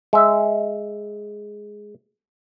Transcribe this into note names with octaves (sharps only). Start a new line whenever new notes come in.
G#3 E5